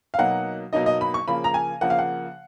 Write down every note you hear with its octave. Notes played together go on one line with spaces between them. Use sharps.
F5
B2 F#3 A#3 D#4 F#5
B2 F#3 A#3 D#4 D#5
D#5
B5
C#6
C#3 F3 A#3 B5
A#5
G#5
C#3 F3 A#3 F#5
F5
F#5